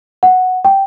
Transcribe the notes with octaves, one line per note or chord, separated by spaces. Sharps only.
F#5
G5